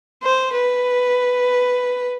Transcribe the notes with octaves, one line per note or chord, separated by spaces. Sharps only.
C5
B4